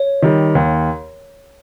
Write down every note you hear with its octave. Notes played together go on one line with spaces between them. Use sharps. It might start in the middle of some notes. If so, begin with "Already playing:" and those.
Already playing: C#5
D#3 G3
D#2